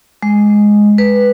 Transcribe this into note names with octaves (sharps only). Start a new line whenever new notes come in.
G#3
B4